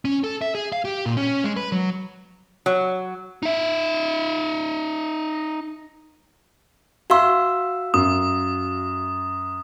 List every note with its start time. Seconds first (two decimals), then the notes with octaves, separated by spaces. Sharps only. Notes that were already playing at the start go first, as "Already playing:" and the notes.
0.05 C#4
0.24 A4
0.41 E5
0.55 G#4
0.72 F5
0.85 G4
1.06 A#2
1.17 C#4
1.44 G#3
1.56 B4
1.72 F#3
2.66 F#3
3.43 D#4 E5
7.10 F#4 E5 F5 C6 E6
7.94 F#2 D#6